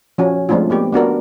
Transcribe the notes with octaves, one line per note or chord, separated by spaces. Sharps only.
F3 C#4 F#4
F3 G#3 A3 C4 D4 F4
A#3 B3 G4
B3 D4 F#4 A#4